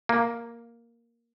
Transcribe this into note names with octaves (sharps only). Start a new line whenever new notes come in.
A#3